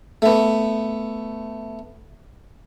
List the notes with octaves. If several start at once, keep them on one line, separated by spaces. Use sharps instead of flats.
A3 B3